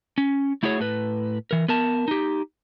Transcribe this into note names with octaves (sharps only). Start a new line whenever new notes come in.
C#4
A3 E4 F#4 G#4 C#5
A2 B4
E3 A#4
B3 A#4 A5
D#4 G4